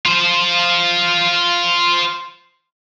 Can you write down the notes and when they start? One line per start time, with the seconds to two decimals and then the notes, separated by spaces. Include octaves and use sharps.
0.06 F4 C5